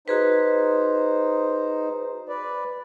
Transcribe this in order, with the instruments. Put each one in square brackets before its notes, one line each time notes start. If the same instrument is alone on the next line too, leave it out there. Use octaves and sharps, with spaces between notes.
[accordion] D#4 C5 [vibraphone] F#4 G#4 B4
[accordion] B4 D5